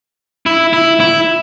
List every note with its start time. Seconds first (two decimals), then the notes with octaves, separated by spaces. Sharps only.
0.46 E4
0.73 E4
1.00 E4